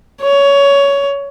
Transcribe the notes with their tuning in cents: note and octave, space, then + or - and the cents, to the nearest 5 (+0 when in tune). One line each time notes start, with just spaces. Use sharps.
C#5 +15